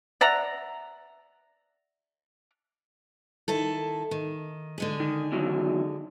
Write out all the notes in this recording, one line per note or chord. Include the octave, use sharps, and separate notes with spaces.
D5 E5 F#5 A#5
D#3 E4 A4
D#3
D3 G#3 G#4
D#3
E2 D#3 F#3